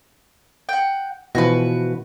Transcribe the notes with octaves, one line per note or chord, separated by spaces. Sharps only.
F#5 G5
B2 E3 F3 F#4 B4